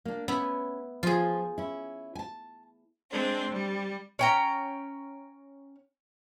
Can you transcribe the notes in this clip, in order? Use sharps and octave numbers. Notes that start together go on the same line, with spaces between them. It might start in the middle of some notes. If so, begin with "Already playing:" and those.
A#3 D4
B3 C#4 E4
F3 F4 G#4
C#4 E4
G#5 A5
G#3 C4 D4 C5
G3
C#4 G5 A#5